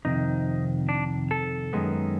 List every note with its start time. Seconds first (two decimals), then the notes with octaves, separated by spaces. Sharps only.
0.05 F2 C3 D#3 D#4
0.89 D4
1.31 A4
1.73 F#2 D#3 G#3 B3